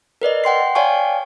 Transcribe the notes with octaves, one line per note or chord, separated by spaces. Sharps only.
A#4 B4 D5 D#5
F#5 G5 C6 C7
C#5 D5 F5 G5 G#5 C#6